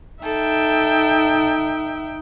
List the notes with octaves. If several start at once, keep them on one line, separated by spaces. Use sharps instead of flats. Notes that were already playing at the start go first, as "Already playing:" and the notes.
D#4 A4 E5 G5